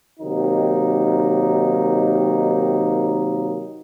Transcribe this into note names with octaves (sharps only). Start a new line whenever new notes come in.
C3 D#3 F#3 A#3 D#4